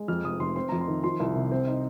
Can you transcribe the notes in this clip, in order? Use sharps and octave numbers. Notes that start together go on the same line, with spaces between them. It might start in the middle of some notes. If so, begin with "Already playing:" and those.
Already playing: G#3
F2 F6
F1 D#6
F1 C6
C4 C6
F2 A#5
C6
D#3
F3 C6
C2
C3
C4
D#4